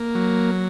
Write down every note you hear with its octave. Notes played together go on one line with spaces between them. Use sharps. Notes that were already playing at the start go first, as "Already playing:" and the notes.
Already playing: A#3
F#3